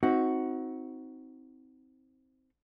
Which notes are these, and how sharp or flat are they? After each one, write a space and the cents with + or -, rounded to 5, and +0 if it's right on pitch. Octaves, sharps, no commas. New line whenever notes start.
C4 +0 D#4 +30 F#4 +0